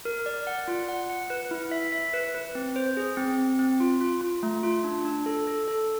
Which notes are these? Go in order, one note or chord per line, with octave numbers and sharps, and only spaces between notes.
A#4
D5
F#5
F4
F#5
F#5
B4
E4
E5
E5
B4
B4
C4
C5
G#4
C4
C4
C4
F4
F4
F4
A3
F4
D4
D4
A4
A4
A4